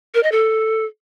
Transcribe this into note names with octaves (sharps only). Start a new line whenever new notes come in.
A#4
D#5
A4